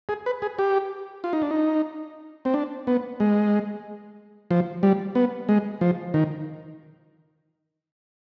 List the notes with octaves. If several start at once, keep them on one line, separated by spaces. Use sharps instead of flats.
G#4
B4
G#4
G4
F4
D#4
D4
D#4
C4
D4
B3
G#3
F3
G3
B3
G#3
F3
D#3